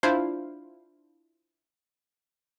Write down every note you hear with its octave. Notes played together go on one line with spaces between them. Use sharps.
D4 E4 F4 C5 F5